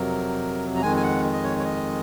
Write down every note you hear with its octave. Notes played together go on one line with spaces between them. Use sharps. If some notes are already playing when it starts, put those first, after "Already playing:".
Already playing: F2 C3 F#3 A#4
A#5
F2 D#3 G#3 G#5
G#5
F#5
D#5
C#5
C#5
D#5